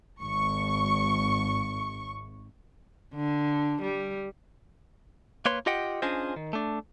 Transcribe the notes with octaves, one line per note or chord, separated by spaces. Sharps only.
G#1 C#6
D3
G3
A#3 B4 C#5 C6
F4 G4 D#5 F#5 G5
C#4 D4 F4 G#4 C5 D#5
D#3
A3 D4